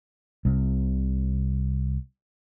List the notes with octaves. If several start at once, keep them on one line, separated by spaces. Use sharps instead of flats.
C2 C3